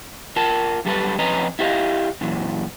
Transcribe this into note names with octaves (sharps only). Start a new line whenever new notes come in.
F4 A#4 A5
F#2 G3 A4 B4
F2 C#4 B4 D#5 A#5
E4 F4 G4 C5 D#5 F5
F#2 A#2 E3